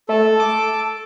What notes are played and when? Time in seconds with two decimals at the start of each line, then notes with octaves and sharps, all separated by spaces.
0.09 A3 A4
0.40 D6